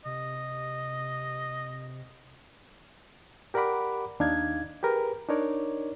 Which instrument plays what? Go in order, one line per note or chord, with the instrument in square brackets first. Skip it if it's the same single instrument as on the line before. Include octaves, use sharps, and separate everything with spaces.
[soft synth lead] C3 [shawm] D#5
[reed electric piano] G4 A#4 D5 F#5 B5 D6
D#2 D4 D#4 F5 G#6
G4 G#4 A#4 B4
D4 D#4 A#4 C#5 D5